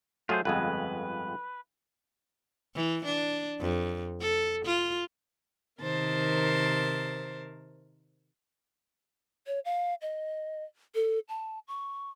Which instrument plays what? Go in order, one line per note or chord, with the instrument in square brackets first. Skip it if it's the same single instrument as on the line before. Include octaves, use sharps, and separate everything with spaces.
[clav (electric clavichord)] F#3 A3 [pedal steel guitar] F4 G#4 C5
[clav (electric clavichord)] G1 F2 G#3 [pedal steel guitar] B4
[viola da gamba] E3
D4
F2
A4
F4
[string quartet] C3 D#3 A#4 C5 A5
[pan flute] C#5
F5
D#5
A4
A5
C#6